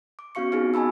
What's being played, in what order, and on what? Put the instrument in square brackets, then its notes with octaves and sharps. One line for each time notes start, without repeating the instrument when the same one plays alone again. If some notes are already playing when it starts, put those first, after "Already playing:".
[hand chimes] D6
B3 C#4 F#4 F5 C#6 C#7
B3 C4 D#4 F4 F#4 G#4
D#5 G#5 A5 B5 E6